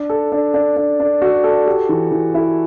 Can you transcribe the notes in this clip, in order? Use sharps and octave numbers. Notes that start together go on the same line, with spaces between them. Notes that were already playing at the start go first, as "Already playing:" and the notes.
Already playing: D4
A4
D4
D4
D4
D4
F#4
A4
G4
E3
E3
E4